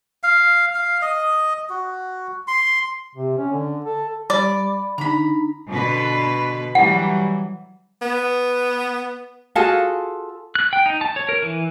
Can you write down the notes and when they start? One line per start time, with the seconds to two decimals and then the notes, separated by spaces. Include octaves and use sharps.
0.23 F5
0.75 F5
1.02 D#5
1.70 F#4
2.47 C6
3.15 C3
3.38 C#4
3.52 D3
3.85 A4
4.30 G3 D5 B5
4.98 D3 D4 D#4 A#5 B5
5.69 B2 D3 B4
6.75 E3 F#3 G3 F#5
8.02 B3
9.55 F4 F#4 G#4 A4
10.55 F#6
10.73 G5
10.86 D#4
11.01 A5
11.16 C#5
11.29 A#4
11.43 E3